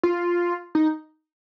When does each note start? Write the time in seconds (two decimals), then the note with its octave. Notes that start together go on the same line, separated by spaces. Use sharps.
0.03 F4
0.75 D#4